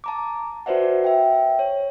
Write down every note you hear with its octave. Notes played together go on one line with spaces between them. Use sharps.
A5 A#5 D6
F#4 B4 C5 D5 E5 F#5
E5 G5
C#5